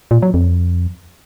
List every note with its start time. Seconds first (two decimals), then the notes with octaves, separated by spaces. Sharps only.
0.11 A#2
0.22 F#3
0.34 F2